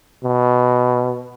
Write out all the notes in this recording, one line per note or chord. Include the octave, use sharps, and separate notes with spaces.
B2